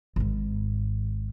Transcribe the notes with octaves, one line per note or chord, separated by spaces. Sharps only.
G#1 G#2